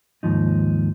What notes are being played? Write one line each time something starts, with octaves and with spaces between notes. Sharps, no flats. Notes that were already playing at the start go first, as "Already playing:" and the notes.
D#2 G#2 F3 D#4